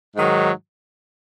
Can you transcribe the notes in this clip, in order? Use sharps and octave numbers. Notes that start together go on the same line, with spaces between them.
G#2 D#3 F#3